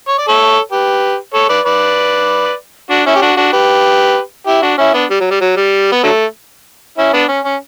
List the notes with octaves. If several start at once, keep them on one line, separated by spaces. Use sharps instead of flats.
C#5
D5
A4 C#5
G4 B4
A4 C#5
B4 D5
B4 D5
D4 F#4
C#4 E4
G4
D4 F#4
D4 F#4
G4 B4
E4 G4
D4 F#4
C#4 E4
B3 D4
G3
F#3
G3
F#3
G3
B3
D3 F#3 A3
C#4 E4
B3 D4
C#4
C#4